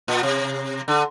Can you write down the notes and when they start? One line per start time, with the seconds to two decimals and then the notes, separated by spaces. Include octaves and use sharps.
0.08 A#2
0.23 C3
0.88 D3